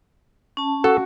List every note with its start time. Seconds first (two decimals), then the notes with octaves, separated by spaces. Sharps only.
0.57 C#4 A5
0.84 F#4 A4